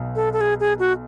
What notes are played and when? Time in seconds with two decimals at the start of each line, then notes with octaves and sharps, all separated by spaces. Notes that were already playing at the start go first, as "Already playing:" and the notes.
Already playing: B1 B2
0.16 A4
0.33 A4
0.41 G#4
0.60 G#4
0.79 F#4